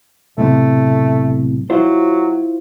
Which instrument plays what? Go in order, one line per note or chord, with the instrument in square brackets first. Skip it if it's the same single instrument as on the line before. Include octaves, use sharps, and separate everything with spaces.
[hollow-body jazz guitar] B1 A2 C3 [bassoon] A3
[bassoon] F#3 [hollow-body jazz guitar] E4 F4 C5